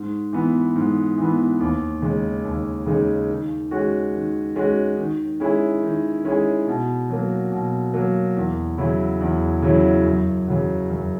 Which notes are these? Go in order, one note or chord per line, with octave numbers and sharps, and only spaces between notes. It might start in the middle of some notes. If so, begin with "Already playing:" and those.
Already playing: G#2
E3 B3
G#2
E3 B3
D#2
C#3 G#3 D#4
D#2
C#3 G#3 D#4
D#3
G#3 C#4 F#4
D#3
G#3 C#4 F#4
D#3
G#3 C#4 E4 G#4
D#3
G#3 C#4 E4 G#4
B2
F#3 A#3
B2
F#3 A#3
E2
C#3 F#3 C#4 E4
E2
C#3 F#3 C#4 E4
F#2
C#3 F#3
F#2